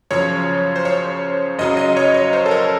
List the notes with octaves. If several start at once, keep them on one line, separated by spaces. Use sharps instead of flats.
F#2 C#3 F3 C#5
C5
C#5
F#2 C#3 F#3 D#5
D#5
C#5
C#5
C5
A4
A#4